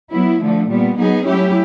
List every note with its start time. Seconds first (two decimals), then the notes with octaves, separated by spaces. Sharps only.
0.13 F#3 B3 E4
0.41 D3 F3 A3
0.70 A#2 G3 B3
0.99 F#3 B3 D#4 G#4
1.27 F#3 A3 C#4 E4 G4